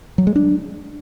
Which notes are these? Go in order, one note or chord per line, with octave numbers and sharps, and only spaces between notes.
F#3
G#3
D4